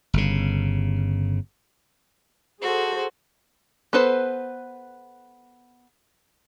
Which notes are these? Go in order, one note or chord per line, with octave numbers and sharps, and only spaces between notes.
G1 C#3
F#4 G#4 A4 C5
B3 A4 B4 C5